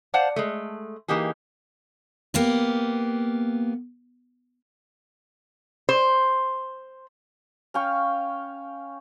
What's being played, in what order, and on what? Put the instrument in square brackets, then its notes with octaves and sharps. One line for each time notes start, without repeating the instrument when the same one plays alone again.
[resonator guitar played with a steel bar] C5 D5 F5 F#5 A5
G#3 A3
E3 A#3 D#4 G4 G#4
[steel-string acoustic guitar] A#3 B3 G4
[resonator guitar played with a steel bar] C5
[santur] C#4 F5 G5 C#6